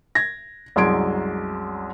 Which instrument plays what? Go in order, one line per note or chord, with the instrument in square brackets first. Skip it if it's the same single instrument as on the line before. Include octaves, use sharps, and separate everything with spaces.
[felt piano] G#6 A#6
C2 F#2 G#3 C6 G#6 D7